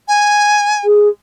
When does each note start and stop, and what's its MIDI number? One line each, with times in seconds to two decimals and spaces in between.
0.08 0.85 80
0.84 1.09 68